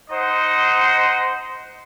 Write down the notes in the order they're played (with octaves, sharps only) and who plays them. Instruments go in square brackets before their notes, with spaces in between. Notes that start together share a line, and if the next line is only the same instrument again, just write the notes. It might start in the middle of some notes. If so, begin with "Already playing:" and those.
[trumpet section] D#4 C5 D#5 F#5